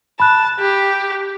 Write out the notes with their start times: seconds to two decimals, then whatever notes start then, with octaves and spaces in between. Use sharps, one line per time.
0.20 A5 B5 F#6
0.59 G4